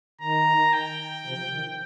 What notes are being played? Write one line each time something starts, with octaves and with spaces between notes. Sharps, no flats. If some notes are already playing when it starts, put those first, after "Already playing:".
D#3 A#5
G5
C3 F3
D#3